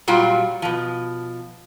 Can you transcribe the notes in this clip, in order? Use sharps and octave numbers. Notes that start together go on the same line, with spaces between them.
A#2 F#3 G3 F4
B2 F3